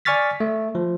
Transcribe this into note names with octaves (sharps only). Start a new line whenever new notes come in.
D5 G#5 C#6 F6 A6 B6
A3
F3